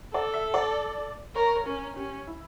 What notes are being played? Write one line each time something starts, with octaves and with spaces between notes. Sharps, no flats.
A4 D5
E5
D5
A#4 C#5
C#5
C#4 A#4
C#4 G4
E4